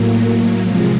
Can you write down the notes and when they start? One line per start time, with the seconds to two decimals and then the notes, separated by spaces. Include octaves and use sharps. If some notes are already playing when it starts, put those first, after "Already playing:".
Already playing: A2 F#3 A#3
0.60 C3 F3 G#3